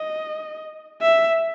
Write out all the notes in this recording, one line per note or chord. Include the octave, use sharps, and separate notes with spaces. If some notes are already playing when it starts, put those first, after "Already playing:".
Already playing: D#5
E5